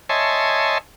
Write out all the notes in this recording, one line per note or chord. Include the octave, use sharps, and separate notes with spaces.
C#5 D#5 E5 G#5 A5 C6